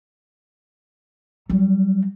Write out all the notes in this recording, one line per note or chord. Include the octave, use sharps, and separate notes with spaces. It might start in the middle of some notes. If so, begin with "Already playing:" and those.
F#3 G3